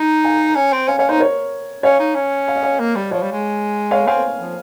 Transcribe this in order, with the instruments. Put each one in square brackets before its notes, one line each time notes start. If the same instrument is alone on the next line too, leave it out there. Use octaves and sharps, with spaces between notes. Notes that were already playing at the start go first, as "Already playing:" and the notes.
Already playing: [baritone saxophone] D#4
[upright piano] F5 G#5
[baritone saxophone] C#4
C4
[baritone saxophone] C#4 [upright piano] F5 G#5
[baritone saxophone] C#4 [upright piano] C#5 F5
[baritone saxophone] D#4 [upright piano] C5 D#5
[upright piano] A#4 C#5
[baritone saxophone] C#4 [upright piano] C#5 F5
[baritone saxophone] D#4
C#4
[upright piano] F5
D#5
C#5 F5
[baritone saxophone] A#3
G3
[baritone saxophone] F3 [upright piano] C#5 F5
[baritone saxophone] G3
G#3
[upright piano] C#5 F5
[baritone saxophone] C4 [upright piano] F5 G#5
[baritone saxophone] F3